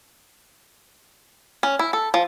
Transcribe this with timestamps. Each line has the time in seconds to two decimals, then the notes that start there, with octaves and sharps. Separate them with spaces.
1.63 C#4
1.79 E4
1.93 A4
2.14 F3